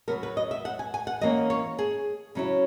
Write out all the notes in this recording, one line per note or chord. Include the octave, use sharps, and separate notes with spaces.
C#3 F#3 B3 A#4
B4
D#5
E5
F#5
G#5
G#5
F#5
E3 A#3 C#4 D#5
C#5
G#4
C#3 F#3 C#4 E4